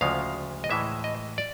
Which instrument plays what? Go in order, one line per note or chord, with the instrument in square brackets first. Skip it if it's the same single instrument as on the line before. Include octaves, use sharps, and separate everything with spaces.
[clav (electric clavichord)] D2 C#3 F3 G#3 F5
D#5
A2 E3 G#3 E5
D#5
D5